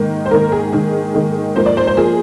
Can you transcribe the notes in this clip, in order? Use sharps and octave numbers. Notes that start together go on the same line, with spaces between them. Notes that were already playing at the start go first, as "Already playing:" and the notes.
Already playing: G#2 D#3 A#3
C5
G#2 D#3 A#3 A#4
G#4
G#2 D#3 A#3 G#4
G#2 D#3 A#3
G#2 F3 A#3 C5
D5
C5
C5
F3 A#3 G#4